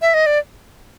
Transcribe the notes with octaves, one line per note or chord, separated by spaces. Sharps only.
E5
D#5
D5